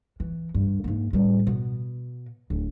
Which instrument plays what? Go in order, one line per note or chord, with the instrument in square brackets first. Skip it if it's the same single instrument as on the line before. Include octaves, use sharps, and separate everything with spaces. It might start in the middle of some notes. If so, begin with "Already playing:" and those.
[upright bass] E3
G2
G#2 A#3
A2 G3
B2
D1